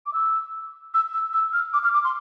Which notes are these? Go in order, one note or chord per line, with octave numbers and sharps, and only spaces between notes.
D6
E6
E6
E6
E6
F6
D6
F6
D6
C6